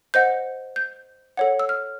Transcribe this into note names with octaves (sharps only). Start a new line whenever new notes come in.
C5 D#5 F#5 G6
G6
A4 C#5 F#5
E6
F6